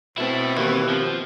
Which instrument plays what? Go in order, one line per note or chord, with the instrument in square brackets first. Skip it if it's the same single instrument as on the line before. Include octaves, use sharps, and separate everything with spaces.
[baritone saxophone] B2 [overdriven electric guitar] A3 E4 [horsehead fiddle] C4
[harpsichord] D#2 [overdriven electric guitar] E3
[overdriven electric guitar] F3